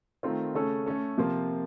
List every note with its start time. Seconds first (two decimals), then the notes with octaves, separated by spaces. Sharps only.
0.23 D#3 A3 C4 F4 A#4
0.54 C#3 A3 C#4 A4
0.86 A3 C#4 A4
1.18 C3 F3 A#3 F4